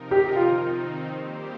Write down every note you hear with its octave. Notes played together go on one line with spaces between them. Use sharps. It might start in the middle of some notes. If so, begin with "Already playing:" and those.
Already playing: C3 F3 D#4 A#4
G4
D#3 C4 D#4 F4
G3 A#3 G4 C5